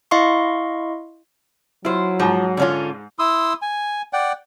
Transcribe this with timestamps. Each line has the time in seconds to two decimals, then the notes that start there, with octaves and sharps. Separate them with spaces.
0.11 E4 D#5 F5 C6 C#6
1.85 F#3 E4 F4 C5
2.20 G#2 F3 A#5
2.57 D3 C#4 F4
3.19 E4 C6 D#6 E6
3.62 G#5
4.13 D5 F#5 G5